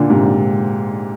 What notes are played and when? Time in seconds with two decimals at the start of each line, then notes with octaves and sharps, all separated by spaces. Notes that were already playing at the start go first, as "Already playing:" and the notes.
Already playing: A#2 D3
0.10 G#2 C3